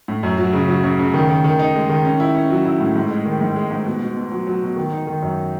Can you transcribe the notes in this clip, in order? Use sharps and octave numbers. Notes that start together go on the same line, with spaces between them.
A2
F#2
F#3
C#3
F#3
C#3
C#3
D#3
D#3
D#3
D#4
G#3
D#3
C#4
E4
C#4
F#3
E4
A2
G#2
G#3
D#3
G#2
G#3
G#2
B2
B2
B2
F#3
F#3
B2
D#3
D#4
D#3
F#2